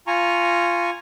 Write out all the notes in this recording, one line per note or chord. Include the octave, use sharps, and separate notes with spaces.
F4 G#5 A#5 C#6